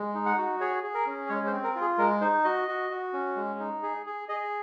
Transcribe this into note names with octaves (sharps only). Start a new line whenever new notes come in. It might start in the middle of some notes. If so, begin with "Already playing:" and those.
Already playing: G#3
D#4
F#5
F#4
G#4 C#5
G#4
A#4
C#4
G#3 C#5
C5
C4
A#4
F4
G#4
G#3 A#4
D#4 C5
F#4 D#5
F#4
F#4
C#4
G#3
D#4
G#4
G#4
G#4 D#5